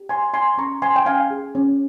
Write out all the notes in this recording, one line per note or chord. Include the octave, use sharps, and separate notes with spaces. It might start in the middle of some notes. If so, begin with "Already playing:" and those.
Already playing: G4
C#5 G#5 C6
C#5 G#5 C6
C6
C#4 A#5 C#6
C5 G#5 C6
G5
C#4 F5 G#5
G#4
C#4